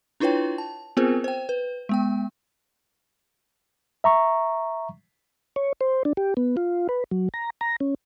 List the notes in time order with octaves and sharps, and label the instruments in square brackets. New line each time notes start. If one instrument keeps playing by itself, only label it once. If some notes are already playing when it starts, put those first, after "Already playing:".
[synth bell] D4 E4 F4 B4 C#5 G5
A5
B3 C4 F4 G#4 A#4 C5
C5 G5
B4
G#3 B3 G5
[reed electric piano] E5 A#5 C#6
[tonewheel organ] C#5
C5
D4
G4
B3
F4
B4
F#3
A#5
A#5
C#4